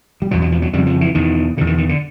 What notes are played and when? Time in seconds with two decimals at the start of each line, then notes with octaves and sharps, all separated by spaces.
0.22 G3
0.31 E2 B2 F#3
0.42 F#3
0.52 F3
0.62 F#3
0.73 F2 C#3 G3
0.87 F3
1.01 E3
1.15 E2 B2 D#3
1.57 B2 D3
1.61 E2
1.67 D#3
1.78 D#3
1.89 D3